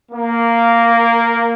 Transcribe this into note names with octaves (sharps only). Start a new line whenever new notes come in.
A#3